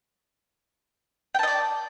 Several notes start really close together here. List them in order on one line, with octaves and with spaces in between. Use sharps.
G5 A5 D#5 D5